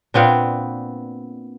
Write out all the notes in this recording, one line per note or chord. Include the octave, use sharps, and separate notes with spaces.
A#2 B3 C4 D4